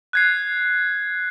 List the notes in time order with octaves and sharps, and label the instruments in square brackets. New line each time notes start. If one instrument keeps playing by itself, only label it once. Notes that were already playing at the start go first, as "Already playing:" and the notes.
[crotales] F#6 G#6 C7